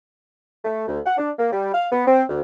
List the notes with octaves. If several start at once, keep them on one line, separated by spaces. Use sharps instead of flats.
A3
D2
F#5
D4
A#3
G3
F5
B3
C4
D2